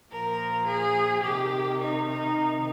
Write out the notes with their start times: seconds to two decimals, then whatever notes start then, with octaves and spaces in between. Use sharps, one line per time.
0.10 A#2 F3 A#4
0.67 G#4
1.23 C3 D#3 G4
1.79 D#4
2.07 D#4
2.36 C3 D#3